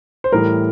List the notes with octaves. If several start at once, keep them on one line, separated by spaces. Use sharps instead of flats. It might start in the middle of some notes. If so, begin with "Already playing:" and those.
C5
A2 E3 G3 A#4